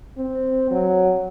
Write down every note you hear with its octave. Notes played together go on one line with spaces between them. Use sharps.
C4
F#3